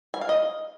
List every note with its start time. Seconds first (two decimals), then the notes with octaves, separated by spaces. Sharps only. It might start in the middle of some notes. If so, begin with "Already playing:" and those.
0.14 G#5
0.21 F5
0.29 D#5